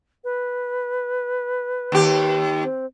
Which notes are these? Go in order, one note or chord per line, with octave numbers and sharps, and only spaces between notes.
B4
D#2 G4
C4